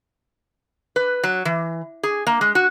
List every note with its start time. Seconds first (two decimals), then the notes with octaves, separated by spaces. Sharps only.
0.96 B4
1.24 F#3
1.45 E3
2.03 G#4
2.27 A#3
2.41 G#3
2.55 F#4